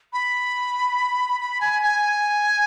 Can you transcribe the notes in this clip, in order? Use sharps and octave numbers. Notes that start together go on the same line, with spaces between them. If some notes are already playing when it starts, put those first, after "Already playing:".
B5
B5
G#5
G#5